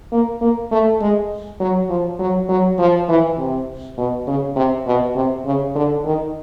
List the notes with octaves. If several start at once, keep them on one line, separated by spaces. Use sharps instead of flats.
A#3
A#3
A3
G#3
F#3
F3
F#3
F#3
F3
E3
C3
B2
C#3
C3
B2
C3
C#3
D3
D#3